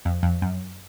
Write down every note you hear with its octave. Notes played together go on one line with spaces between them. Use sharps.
F2
F2
F#2